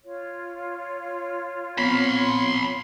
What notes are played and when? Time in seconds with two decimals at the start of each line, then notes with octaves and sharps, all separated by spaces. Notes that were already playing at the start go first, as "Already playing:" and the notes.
0.04 F4 C#5
1.78 B3 C4 B5 C6